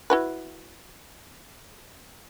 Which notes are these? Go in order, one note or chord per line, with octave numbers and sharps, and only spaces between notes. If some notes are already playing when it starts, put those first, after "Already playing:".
E4 F#4 B4